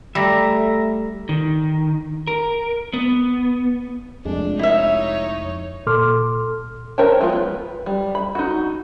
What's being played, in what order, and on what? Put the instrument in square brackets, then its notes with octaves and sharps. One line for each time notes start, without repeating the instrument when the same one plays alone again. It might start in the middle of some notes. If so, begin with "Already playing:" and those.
[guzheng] G3 [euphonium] A3 [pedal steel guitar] E5 A#5
[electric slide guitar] D#3
A#4
B3
[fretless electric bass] F1 F2 G#3 [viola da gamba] D4
[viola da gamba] D#4 C#5 [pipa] E4 E5
[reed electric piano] A#2 A4 C6 D6 F6
[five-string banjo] A#4 C5 C#5 G5 A5
F3 G#3 B3 F4
B4
G3
B5
D#4 F#4